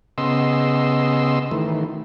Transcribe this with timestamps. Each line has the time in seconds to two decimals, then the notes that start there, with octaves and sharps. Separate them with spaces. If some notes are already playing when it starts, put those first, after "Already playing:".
0.18 C#3 B3 D#5 C6 E6
1.51 D#3 E3 A3